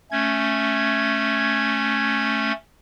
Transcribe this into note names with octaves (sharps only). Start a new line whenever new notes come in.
A3 C#4 G#6